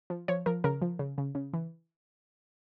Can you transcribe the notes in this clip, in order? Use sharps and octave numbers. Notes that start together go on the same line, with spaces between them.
F3
F3 C#5
F3 A#4
C#3 A#4
F3
C#3
C#3
C#3
E3